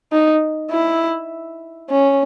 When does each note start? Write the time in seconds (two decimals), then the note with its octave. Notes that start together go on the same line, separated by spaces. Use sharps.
0.12 D#4
0.71 E4
1.90 C#4